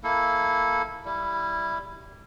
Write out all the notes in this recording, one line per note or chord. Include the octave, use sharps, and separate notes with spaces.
A#3 E4 A4
G3 E4